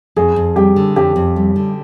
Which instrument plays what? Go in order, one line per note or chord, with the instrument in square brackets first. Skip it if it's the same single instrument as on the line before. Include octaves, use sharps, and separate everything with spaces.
[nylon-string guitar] F2 [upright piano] G#4
[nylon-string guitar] F2
[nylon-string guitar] G3 [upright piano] G4
[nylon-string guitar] D3
[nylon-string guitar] F2 [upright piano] G4
[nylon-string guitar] F2
G3
D3